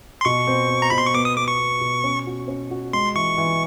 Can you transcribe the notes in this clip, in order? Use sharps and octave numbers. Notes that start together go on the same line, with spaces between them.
C6
B2 C#6
C4
C4
A#5
B2 B5
C6
C#6
B3 D6
D#6
B3 D6
C#6
B3
B2
C#4
F#4
C#4
F#4
G#3 C6
E3 C#6
E3